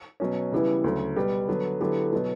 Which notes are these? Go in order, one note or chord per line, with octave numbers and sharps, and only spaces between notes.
B2 F#3 C#4
C#3 E3 G3 B3 E4
D2 C#3 F#3
B2 G3 B3
D3 F#3 B3
D3 F#3 B3 E4 G4
B2 F#3 B3